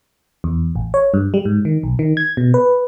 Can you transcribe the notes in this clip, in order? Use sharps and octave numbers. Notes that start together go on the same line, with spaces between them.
E2
A1
C#5
G2
G3
G#2
D#3
B1
D#3
G#6
B2
B4